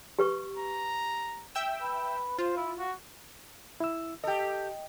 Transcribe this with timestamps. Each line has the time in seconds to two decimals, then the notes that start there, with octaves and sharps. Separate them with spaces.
0.19 G4 B4 C#6
0.57 A#5
1.55 E5 G5 E6
1.82 B4
2.38 F4 C5
2.57 E4
2.79 F#4
3.80 E4 E6
4.24 G4 A4 D#5 G5